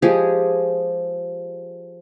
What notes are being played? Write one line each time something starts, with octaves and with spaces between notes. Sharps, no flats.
F3 G#3 G4 G#4